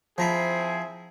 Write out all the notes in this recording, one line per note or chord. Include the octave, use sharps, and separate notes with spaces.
F3 C4 E4 G#4 A#5 B5